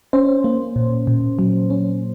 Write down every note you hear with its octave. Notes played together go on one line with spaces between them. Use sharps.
C#4 C5
A#3
A#2
A#2
F#3
C#4